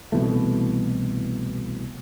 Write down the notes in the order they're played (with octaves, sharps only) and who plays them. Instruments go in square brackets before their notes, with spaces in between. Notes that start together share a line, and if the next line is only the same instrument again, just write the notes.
[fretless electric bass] C2 B2 E3 A3